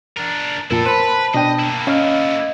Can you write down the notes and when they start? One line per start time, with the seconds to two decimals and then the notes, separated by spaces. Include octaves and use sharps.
0.17 D4 A#4
0.71 F2 A#2 E4 A4 A#4 A5
0.86 B4 C5 A5 B5
1.34 B2 D4 D#5 G5
1.60 A#3 E4
1.87 C#4 D#5 F5 F6